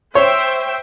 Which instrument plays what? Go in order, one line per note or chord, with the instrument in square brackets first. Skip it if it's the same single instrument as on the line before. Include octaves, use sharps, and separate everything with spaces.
[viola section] C5 E5 G5 [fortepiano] C#5